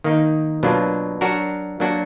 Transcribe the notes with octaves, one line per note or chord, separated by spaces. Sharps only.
D#3 A#3 D#4
B2 F#3 A#3 D4 F4
F#3 D4 F#4 A#4
F#3 A#3 D4 F#4